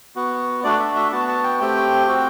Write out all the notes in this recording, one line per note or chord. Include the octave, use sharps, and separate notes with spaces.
B3 F#4
A3 D4 F#4 D5
E5
E5
B3 F#4 A5
A5
G5
A3 C4 G4 G5
C4 F#4